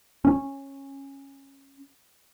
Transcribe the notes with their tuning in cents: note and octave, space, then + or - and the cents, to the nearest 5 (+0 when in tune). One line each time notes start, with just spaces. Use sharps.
C#4 -15